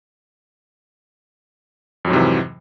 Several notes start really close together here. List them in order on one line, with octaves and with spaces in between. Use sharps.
F2 F#3 G#2 C3 E3